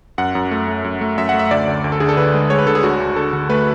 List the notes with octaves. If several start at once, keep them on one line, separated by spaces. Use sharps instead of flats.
F#2 F#5
F#2
A3
A3
F#2
A3
F#2 E5
F#5
A3
E5
D2 D5
D2
D2
A4
D3 G#4
A4
D3 B4
G#3
G#3 C#5
B4
D3 A4
G#4
D2 F#4
D2
D3 A4
D3
A3 B4